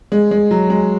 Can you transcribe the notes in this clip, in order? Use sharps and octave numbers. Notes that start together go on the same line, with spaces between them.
G#3
G#3
F#3
G#3